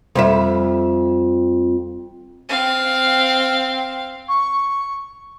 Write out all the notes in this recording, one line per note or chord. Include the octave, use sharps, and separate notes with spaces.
F2 G3 E5
C4 F5
C#6